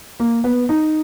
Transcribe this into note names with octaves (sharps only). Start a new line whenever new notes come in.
A#3
B3
D#4